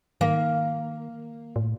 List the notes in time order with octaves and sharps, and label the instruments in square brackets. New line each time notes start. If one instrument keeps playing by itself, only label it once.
[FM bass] D#3 [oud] A#3
[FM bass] A2